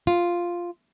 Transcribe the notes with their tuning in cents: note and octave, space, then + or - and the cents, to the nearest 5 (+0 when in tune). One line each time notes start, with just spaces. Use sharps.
F4 +0